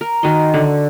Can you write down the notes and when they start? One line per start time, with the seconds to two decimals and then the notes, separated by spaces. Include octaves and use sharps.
0.01 A#4
0.23 D#3 F#4 D#5 C6
0.54 D3